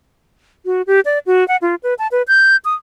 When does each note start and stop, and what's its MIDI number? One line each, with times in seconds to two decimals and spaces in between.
0.66 0.82 66
0.87 1.00 67
1.05 1.19 74
1.26 1.47 66
1.48 1.57 78
1.62 1.75 65
1.83 1.94 71
1.99 2.07 81
2.12 2.22 71
2.28 2.56 91
2.65 2.74 87